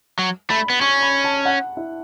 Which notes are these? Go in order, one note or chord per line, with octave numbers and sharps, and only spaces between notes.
F#3
A3 B5
B3
C#4 C#6
B5
A5
F#5
E4